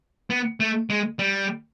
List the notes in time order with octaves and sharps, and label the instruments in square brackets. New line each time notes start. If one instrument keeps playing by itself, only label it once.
[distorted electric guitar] B3
A3
G#3
G3